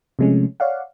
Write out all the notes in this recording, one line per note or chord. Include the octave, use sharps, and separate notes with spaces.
C3 F3 G#3 A3 C#4
C#5 D5 F5 F#5